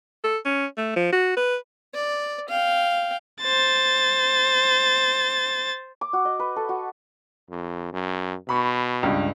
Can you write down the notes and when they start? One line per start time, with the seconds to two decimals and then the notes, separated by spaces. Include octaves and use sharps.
0.24 A4
0.45 C#4
0.77 A3
0.96 F3
1.12 F#4
1.37 B4
1.94 D5
2.49 F5 G5
3.41 C5 A6
6.01 D6
6.13 F#4
6.25 D#5
6.39 B4
6.56 A4
6.69 F#4
7.50 F2
7.93 F#2
8.49 B2 B5 C#6
9.03 C#2 G2